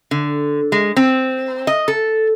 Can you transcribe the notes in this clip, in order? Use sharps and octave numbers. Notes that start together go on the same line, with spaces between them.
D3
G#3
C4
D#5
A4